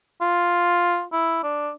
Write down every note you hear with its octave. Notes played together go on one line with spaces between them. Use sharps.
F4
E4
D4